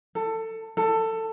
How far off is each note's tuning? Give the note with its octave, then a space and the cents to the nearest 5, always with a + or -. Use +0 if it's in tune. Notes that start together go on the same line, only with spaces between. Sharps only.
A4 +20
A4 +20